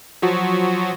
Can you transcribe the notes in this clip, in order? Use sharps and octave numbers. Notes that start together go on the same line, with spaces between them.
F3 F#3 F#4